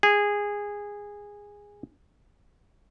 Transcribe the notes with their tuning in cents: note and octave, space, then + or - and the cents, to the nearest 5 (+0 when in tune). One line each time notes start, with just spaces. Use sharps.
G#4 -15